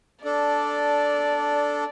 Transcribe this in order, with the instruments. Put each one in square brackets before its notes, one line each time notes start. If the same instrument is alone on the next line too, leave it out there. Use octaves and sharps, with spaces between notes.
[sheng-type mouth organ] D4 A4 [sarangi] D5